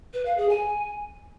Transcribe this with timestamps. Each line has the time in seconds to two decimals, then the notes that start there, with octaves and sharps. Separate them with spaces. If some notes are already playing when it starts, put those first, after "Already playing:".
0.14 B4
0.25 F5
0.37 G#4
0.49 G#5